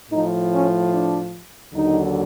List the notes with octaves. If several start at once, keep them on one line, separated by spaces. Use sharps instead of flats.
A2 F3 D#4
C#4
D4
D#2 D3 F#3 D#4